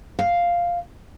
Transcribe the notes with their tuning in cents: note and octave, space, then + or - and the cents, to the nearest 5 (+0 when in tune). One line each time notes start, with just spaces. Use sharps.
F5 +0